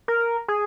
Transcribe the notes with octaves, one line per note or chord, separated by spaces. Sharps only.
A#4
G#4